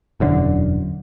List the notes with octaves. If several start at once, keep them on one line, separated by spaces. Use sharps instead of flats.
E1 F#2 D3